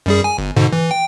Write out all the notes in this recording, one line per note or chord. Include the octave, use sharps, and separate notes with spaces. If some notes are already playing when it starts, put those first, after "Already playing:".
F#2 G3 G#4
G#5
G1
G#2 B2 D3
E3
G5